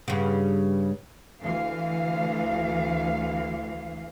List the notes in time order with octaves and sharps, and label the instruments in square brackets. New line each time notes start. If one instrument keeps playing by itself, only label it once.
[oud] G2 C#3
[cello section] D2 E3 F5